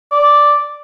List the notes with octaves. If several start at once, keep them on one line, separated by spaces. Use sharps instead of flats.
D5